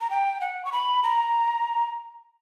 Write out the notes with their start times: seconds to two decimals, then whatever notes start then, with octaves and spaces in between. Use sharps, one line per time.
0.01 A#5
0.10 G5
0.41 F#5
0.65 C#6
0.72 B5
1.03 A#5